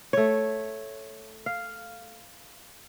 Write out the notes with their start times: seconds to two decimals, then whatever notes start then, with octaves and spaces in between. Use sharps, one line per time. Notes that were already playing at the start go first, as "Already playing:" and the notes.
0.13 A3 C#5
1.46 F5